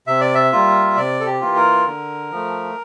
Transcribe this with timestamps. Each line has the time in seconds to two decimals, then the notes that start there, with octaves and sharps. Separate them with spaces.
0.07 C3 E5
0.21 D5
0.35 E5
0.52 G3 A#3 F4
0.97 C3 D5
1.20 A4
1.26 G4
1.41 E3 A#3 F4
1.56 A#4
1.86 D3
2.31 F3 A3